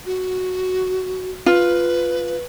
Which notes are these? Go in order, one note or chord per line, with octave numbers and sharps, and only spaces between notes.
F#4
F4 B4